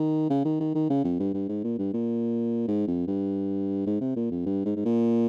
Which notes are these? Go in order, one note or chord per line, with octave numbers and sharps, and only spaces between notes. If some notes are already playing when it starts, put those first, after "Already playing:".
Already playing: D#3
C#3
D#3
D#3
D#3
C#3
F2
G2
G2
G#2
A#2
G2
A#2
G#2
F2
G2
G#2
C3
A#2
F2
G2
G#2
G#2
A#2